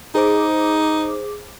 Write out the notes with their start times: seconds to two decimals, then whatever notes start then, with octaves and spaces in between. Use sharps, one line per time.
0.15 D#4 G#4 C5 D6